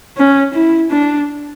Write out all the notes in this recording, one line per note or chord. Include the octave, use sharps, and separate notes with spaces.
C#4
E4
D4